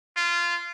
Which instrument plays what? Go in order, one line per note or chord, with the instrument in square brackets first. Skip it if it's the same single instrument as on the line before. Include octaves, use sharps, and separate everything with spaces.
[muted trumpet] F4